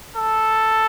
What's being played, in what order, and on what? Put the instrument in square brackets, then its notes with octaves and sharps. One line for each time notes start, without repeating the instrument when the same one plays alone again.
[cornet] A4